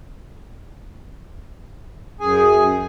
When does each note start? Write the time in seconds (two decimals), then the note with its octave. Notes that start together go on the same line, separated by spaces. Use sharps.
2.20 F#2 G#4 G#5